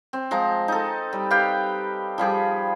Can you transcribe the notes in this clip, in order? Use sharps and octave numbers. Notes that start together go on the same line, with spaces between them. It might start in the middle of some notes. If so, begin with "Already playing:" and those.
C4
F3 G#3 A#5
D#4 A4
G3
G4 B4 F5 G5
F3 G3 G#4 G5